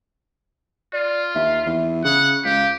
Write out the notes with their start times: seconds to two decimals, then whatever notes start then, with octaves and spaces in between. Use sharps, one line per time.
0.93 F4 D5
1.35 D#2 E5
1.66 E2
2.04 C#3 F#5
2.44 C#2 G4 F5